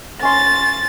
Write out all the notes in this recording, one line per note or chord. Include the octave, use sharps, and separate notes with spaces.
C#4 C6 A6